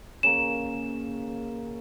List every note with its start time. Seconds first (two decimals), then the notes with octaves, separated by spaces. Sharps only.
0.23 C#3 A#3 E7